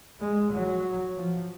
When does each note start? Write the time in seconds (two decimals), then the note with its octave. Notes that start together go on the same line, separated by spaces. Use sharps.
0.20 G#3
0.52 F#3
1.17 F3